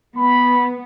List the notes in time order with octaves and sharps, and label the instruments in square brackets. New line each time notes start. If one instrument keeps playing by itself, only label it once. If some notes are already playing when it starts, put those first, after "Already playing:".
[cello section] B3 [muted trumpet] B5